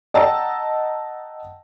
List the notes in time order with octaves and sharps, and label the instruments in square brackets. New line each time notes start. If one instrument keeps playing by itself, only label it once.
[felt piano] D#5 F#5 G5 A5 A#5 E6